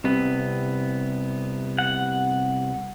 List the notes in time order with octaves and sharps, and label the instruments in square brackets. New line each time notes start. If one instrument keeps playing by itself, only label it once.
[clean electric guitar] C2 C3 B3
[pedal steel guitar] F#5